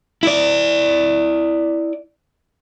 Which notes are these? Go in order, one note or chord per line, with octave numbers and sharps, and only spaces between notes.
E4 D5